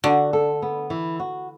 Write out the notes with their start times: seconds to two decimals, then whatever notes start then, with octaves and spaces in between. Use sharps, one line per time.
0.04 D3 F#4
0.33 A4
0.62 B3
0.90 E3
1.20 F#4